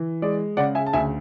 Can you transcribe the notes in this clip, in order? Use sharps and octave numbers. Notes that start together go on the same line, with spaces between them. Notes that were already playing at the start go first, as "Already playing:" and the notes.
Already playing: E3
G#3 D5
C#3 D5 F#5
E5 G#5
A5
D2 E5 G#5